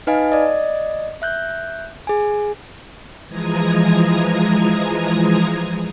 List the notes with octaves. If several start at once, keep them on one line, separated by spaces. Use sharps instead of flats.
D#4 B4 D#5 F5 G#5
D5 D#5
E5 F#6 G6
G#4 G#5
E3 F3 G#3 A#5 D#6 G#6